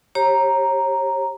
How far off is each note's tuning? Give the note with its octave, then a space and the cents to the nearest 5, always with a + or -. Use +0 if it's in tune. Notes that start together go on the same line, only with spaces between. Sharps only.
G4 +0 C#5 -40 A#5 +0